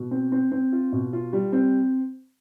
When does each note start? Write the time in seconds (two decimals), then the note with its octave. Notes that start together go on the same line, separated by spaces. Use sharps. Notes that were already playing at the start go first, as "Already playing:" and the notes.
Already playing: B2
0.11 C4
0.32 C4
0.52 C4
0.73 F4
0.92 B2
1.13 F4
1.33 G3
1.53 C4